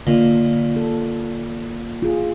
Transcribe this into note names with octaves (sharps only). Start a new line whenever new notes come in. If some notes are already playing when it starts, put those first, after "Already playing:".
A#2 D3 A#3 D#5
A4
F4 G#4